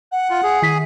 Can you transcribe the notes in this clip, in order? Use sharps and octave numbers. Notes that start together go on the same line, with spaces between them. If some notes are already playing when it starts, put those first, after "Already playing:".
F#5
F4
G#4
D#3 G#5 B6